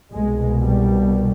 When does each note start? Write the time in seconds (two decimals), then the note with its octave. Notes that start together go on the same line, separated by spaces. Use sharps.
0.12 C2 B2 G#3
0.62 G3